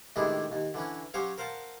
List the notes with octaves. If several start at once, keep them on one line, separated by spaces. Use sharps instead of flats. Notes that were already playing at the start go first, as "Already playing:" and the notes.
A2 C3 D#3 G#3 D4 E4
D#2
D3 E3 C#4
F#3 C#4 G4 C5 C#5 F5
A#4 C5 F5 F#5 A5